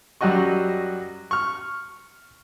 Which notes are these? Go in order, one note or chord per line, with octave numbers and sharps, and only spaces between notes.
F#2 F#3 G3 F#4 D#5 C#6
C#6 F6